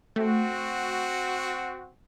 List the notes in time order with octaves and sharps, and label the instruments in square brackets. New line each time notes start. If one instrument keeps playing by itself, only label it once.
[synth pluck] A3 [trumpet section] C4 F#4